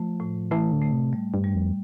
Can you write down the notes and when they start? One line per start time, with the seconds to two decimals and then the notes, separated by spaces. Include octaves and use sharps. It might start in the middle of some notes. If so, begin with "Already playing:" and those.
Already playing: F3 A3
0.20 A2
0.51 E3 A3
0.72 D3
0.82 A3
0.92 C3
1.13 G3
1.34 G2
1.44 G3
1.55 F2